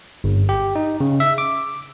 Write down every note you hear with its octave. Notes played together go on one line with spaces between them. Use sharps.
G1
G4
D#4
C#3
E5
D6